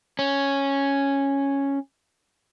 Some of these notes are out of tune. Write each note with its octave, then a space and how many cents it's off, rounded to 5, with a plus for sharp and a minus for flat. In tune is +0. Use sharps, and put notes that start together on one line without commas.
C#4 -5